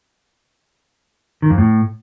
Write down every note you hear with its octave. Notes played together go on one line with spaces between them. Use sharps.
D#3
F2
A2